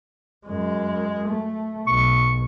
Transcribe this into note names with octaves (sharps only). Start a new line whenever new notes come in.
F#2 G#3
A3
B1 C#6